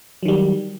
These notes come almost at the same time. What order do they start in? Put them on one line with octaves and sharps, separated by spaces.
F#3 D#3 G3